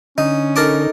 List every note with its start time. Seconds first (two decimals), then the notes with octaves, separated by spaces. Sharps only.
0.18 D3 C#4 D#4
0.56 D#4 A4 A#4 A5 D6